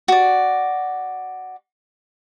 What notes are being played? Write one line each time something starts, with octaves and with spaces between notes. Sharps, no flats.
F#4 D5